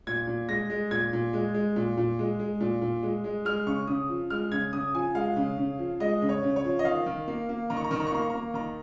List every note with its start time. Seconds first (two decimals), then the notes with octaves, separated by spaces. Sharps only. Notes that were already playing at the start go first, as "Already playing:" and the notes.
0.07 A#2 G#6
0.27 A#2
0.48 G#3 A#6
0.70 G#3
0.91 A#2 G#6
1.13 A#2
1.33 G#3
1.54 G#3
1.76 A#2
1.97 A#2
2.19 G#3
2.39 G#3
2.60 A#2
2.82 A#2
3.03 G#3
3.24 G#3
3.45 G#3 F6
3.66 C#3 C#6
3.88 C#3 D#6
4.09 F3
4.30 G#3 F6
4.52 C#3 G#6
4.73 C#3 D#6
4.94 F3 G#5
5.15 G#3 F5
5.36 C#3
5.58 C#3
5.79 F3
6.00 G#3 D#5
6.22 C#3
6.29 C#5
6.43 C#3
6.56 C#5
6.64 F3
6.79 D#5
6.84 D#3 F5
7.06 D#3
7.28 A#3
7.49 A#3
7.70 D#3 A#5
7.77 C#6
7.84 A#5
7.91 D#3 C#6
8.00 A#5
8.07 C#6
8.12 A#3 A#5
8.22 C#6
8.30 A#3 A#5
8.54 D#3 A#5